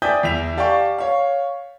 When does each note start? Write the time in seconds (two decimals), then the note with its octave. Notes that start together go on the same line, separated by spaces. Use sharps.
0.02 D5 E5 G5 G#5 D#6 G6
0.23 E2 E5 F7
0.57 G4 D5 F5 G5 A5 C#6
0.98 C#5 F5